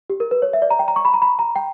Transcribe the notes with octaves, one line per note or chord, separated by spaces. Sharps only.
G4
A#4
B4
C#5
E5
D5
A#5
G5
A#5
C#6
B5
A#5
B5
A#5
G5